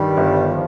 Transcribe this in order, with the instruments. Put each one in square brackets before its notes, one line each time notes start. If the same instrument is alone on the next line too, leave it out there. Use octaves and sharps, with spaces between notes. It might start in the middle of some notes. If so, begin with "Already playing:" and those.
Already playing: [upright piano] G2 D#3 [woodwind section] G3
[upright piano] G1
[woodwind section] F3